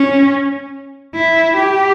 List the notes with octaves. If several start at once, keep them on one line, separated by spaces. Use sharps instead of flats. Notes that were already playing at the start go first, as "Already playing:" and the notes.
Already playing: C#4
E4
G4